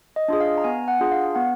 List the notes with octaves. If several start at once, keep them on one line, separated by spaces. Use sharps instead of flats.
D#5
D4 F4 G#4 D#5
F5
A#5
B3 G#5
F#5
D4 F4 G#4
F5
B3 F#5